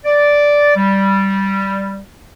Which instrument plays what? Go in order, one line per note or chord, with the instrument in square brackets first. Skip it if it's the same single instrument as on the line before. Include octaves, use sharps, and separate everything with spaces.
[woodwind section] D5
G3